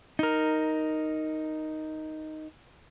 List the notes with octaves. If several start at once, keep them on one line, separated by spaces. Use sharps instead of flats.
D#4 A#4